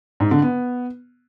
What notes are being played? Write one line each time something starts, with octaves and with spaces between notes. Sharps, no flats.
G#2
D3
B3